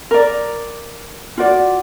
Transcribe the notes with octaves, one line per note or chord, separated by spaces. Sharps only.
A#4 D5
F4 F#4 D5